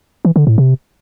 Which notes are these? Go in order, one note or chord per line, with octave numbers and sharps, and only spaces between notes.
E3
D3
A2
C3